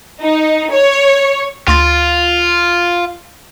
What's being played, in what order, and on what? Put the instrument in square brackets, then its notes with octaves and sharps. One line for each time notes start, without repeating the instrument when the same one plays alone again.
[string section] D#4
C#5
[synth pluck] D2 C6 A6 [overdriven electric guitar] F4